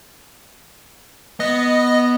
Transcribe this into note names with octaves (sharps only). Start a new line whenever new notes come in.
B3 D#5